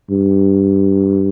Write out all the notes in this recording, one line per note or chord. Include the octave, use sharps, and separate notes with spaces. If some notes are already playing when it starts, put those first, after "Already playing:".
G2